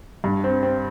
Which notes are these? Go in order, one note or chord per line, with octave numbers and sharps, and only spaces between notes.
G2
C4
C4